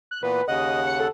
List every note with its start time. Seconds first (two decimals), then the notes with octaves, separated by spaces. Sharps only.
0.11 F#6
0.23 A#2 E3 B3 B4
0.48 D#2 C#3 D#5 F#5
0.87 C#7
1.00 A4